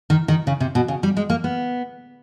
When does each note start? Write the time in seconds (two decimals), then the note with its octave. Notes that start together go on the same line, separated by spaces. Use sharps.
0.10 D#3
0.28 D#3
0.47 C#3
0.60 C3
0.75 B2
0.88 C#3
1.03 G3
1.17 G#3
1.30 A#3
1.44 B3